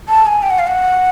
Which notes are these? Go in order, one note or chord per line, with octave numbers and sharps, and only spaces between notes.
A5
G#5
G5
F#5
F5
F#5